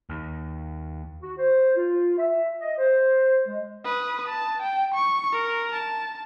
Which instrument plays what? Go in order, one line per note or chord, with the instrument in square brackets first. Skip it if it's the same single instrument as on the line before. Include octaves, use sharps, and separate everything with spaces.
[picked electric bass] D#2
[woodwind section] F#4
C5
F4
E5
D#5
C5
G#3
[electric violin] B4 D#6
A5
G5
C#6
A#4
A5